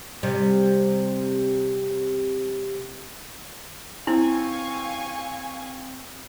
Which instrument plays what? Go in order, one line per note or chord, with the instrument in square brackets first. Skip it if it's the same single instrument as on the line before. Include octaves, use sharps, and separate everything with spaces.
[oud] C3 G3
[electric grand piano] C4 [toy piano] E4 [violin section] F5 G#5 C#6